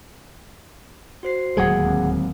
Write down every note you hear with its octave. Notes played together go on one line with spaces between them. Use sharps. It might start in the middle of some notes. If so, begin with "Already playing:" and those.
F#4 C5 C7
D1 D#2 F#3 G#3 G4 G#4 F#5
C4